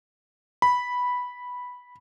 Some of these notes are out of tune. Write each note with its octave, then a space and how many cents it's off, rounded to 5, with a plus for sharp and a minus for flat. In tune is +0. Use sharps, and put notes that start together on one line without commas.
B5 -5